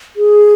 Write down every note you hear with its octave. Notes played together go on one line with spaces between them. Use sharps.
G#4